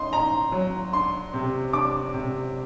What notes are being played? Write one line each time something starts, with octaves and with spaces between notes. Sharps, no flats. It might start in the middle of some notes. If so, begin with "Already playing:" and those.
Already playing: D#4 C6
D#4 A#5
F#3
D4 C6
C3
D4 D6
C3